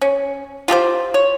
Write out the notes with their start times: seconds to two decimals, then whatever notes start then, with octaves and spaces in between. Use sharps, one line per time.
0.01 C#4
0.68 F4 G4 G#4 C5
1.14 C#5